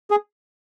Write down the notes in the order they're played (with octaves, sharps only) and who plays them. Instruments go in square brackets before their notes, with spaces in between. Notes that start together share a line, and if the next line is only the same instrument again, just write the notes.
[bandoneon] G#4